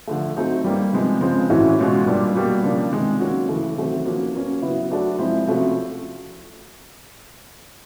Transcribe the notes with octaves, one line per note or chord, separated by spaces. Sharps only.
D3 F3 A3
F#3 A3 C4 D#4
G3 A#3 D#4
C3 F3 G#3 B3
C#3 F3 G#3 C4
A2 E3 A3 C#4 F#4
B2 G#3 C#4 F4
A#2 G3 A#3 D4
B2 G3 A#3
C#3 F3 A#3 D4
C3 D#3 G#3
F#3 A#3 C#4 F#4
C#3 E3 A3
C3 D#3 F#3 A3 C4
F3 A#3 C#4 F#4
F#3 A#3 C#4 F#4
C#3 F#3 B3 E4
F#3 A3 D4 F#4
F3 G#3 C4 E4
C3 F3 A3 C#4 F#4